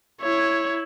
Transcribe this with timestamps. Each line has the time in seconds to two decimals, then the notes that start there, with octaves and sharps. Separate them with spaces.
0.22 E4 C#5